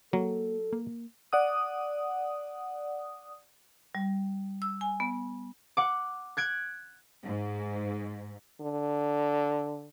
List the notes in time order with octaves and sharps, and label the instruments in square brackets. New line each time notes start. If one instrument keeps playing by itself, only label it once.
[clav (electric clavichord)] F#3 [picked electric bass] A#3 [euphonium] A4
[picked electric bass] A#3
[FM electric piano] D5 F#5 D#6
[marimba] G3
E6
G#5
B3
[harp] F#5 D6
F#6 G#6 D7
[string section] G#2
[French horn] D3